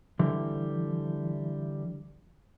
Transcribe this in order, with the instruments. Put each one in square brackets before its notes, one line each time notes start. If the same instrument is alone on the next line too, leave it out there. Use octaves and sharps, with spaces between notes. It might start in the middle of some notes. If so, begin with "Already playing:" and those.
[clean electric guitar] D3 E3 G3